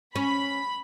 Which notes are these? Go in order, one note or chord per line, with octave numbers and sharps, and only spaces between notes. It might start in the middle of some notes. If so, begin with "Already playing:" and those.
C#4 B5